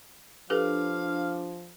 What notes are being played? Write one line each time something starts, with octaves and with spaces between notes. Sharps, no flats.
F3 D4 G4 A4 B4 F5